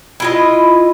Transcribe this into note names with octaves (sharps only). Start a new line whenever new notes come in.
E4 F4 D#5